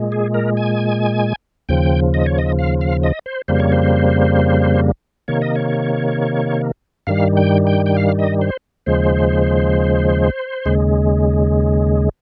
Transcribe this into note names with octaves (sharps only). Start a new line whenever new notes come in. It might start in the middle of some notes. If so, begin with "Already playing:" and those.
Already playing: A#2 G#3
G#4
A#4
G#5
D#2 C#3 F3 G5
D#5
C#5
D#5
F5
F5
D#5
C5
F2 C#3 G3 A#3 C5
C#5
C5
C3 D#3 A#3 C#5
D#5
C#5
G2 D#3 G3 F5
G5
G5
G5
F5
D#5
C5
D#2 C#3 F3 G#3 C5
D#2 C#3 G#3